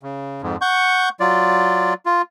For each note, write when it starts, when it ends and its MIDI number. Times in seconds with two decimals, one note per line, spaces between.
0.03 0.42 49
0.42 0.57 41
0.42 0.57 44
0.61 1.09 78
0.61 1.09 85
0.61 1.09 91
1.20 1.94 54
1.20 1.94 65
1.20 1.94 74
2.06 2.22 65